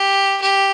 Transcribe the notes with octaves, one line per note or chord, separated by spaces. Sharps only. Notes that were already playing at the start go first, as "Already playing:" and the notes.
Already playing: G4
G4